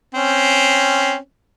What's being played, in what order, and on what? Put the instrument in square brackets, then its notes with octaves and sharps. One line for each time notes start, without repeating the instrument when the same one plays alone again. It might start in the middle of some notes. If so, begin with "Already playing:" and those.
[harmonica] C4 C#4